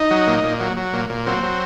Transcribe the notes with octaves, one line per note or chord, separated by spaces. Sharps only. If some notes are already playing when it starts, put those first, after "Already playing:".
Already playing: D#4
F#3
A#2
A#2
F#3
F#3
A#2
A#2
F#3 C4
F#3